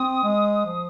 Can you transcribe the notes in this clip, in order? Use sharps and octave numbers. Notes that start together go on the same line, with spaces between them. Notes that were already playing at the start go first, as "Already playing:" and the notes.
Already playing: C4 D#6
G#3
F3